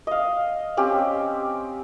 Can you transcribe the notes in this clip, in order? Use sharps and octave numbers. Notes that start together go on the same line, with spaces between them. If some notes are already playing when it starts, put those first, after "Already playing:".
D#5 F5
C4 C#4 G4